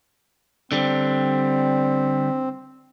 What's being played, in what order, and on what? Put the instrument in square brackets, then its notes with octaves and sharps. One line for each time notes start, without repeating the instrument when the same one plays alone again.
[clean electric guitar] D3 G3 [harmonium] C4